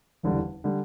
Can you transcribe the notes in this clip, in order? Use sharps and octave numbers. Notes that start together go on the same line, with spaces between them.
F#1 E2 D3 G3
D3 G3